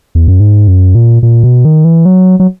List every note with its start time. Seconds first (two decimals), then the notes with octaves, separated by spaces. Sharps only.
0.15 E2
0.28 F#2
0.40 G#2
0.68 F#2
0.95 A#2
1.23 A#2
1.44 B2
1.65 D#3
1.85 E3
2.05 F#3
2.40 F#3